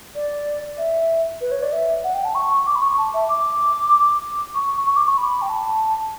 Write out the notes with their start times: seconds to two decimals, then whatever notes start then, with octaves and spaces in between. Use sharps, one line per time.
0.15 D5
0.78 E5
1.41 B4
1.51 C#5
1.62 D5
1.72 E5
2.04 F#5
2.14 G5
2.25 A5
2.35 C#6
2.67 D6
2.75 B5
2.82 C#6
2.98 A5
3.14 E5
3.29 D6
4.55 C#6
4.86 C#6
4.96 D6
5.07 C#6
5.17 B5
5.42 G5
5.49 A5